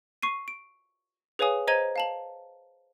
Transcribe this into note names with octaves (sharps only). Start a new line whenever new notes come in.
C#6 C7 D#7
D7
G#4 B4 C#5 F5 G#5 D#6
C5 D#5 A#5 G#6 D#7 G7
F5 A5 F#7